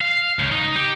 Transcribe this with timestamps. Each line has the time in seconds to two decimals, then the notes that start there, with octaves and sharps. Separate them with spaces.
0.01 F5
0.39 C#2
0.52 D#4
0.76 G4